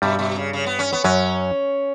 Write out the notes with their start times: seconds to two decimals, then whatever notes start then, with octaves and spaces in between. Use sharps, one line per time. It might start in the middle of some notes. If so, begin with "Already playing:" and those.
0.02 G2 B2 G3
0.19 B2
0.36 C#3
0.53 C#3
0.66 B3
0.79 C#4
0.92 B3
1.04 F#2 F#3 C#4